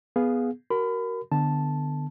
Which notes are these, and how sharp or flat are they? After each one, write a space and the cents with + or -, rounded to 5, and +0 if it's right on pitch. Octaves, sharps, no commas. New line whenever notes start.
B3 +0 G#4 +0 F5 +0
F#4 +25 A#4 +0 B5 +30
D3 +20 B3 +15 A5 +0